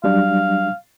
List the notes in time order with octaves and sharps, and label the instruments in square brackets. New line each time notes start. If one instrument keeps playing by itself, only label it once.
[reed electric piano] F#3 G3 D4 [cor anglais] F5